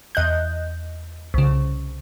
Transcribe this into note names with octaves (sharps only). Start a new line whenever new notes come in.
E2 D#5 F#6 G6
C2 C#3